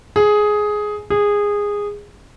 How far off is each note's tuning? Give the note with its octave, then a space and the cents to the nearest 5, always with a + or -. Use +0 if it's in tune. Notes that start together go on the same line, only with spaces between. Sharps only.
G#4 +10
G#4 -15